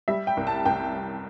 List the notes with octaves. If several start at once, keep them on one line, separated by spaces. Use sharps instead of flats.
G3 E5
G5
C2
A5
C2 G5